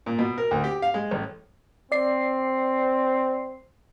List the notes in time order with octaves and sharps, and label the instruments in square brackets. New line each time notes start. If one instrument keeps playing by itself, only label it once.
[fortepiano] A#2
B2
A#4
D2
G4
F5
G#3
A1
[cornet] C4 [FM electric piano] D5 C7